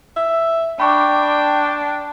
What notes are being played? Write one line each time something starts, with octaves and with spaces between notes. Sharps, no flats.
E5
D4 G5 B5 C#6 D6